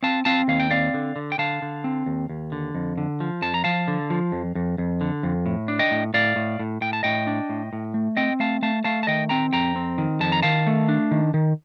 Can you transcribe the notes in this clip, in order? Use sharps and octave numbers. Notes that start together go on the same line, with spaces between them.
C4 F5 A5
C4 F5 A5
D#2 F5
G5
C4 D5 F5
D3
D3
G5
D3 F5 A5
D3
C4
D#2
D#2
D3
F2
D3
F3
F2 A5
A#5
F3 F5 A5
D3
F3
F2
F2
F2
D3
F2
A2
D4
D#5 G5
A2
A2 D5 F5
A2
A2
A2 G5
A5
A2 D#5 G5
D4
A2
A2
A3
C4 D#5 G5
A3 F5 A5
A3 F5 A5
A3 F5 A5
A5
D#3 D#5 G5
C4 G5 A#5
F2 G5 A#5
C4
D#3
F2 A5
A#5
D#3 F5 A5
A3
D4
D#3
D#3